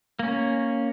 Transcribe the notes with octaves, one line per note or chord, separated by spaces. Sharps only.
A#3 C#4